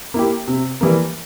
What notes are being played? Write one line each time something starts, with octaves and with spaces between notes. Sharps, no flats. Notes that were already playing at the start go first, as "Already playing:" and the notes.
A#3 E4 G4
C3
E3 G3 A#3